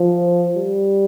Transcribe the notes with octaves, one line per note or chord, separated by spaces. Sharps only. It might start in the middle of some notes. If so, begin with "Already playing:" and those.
Already playing: F3
G3